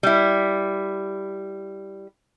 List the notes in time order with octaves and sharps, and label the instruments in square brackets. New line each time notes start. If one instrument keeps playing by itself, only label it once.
[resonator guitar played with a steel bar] G3 E4